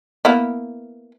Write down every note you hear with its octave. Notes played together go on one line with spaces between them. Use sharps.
A#3 B3 E4